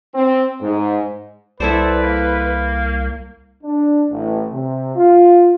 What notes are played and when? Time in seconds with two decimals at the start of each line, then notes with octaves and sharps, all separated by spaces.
0.14 C4
0.61 G#2
1.60 C2 E4 A4 B4 C5 D5
2.03 A#3
3.63 D4
4.10 A1
4.51 C3
4.95 F4